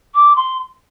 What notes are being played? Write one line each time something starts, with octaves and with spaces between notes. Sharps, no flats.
D6
C6